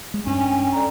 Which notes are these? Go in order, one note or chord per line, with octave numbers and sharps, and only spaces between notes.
G#3
G2 C#4 D4 G5 G#5
A4 D5 A#5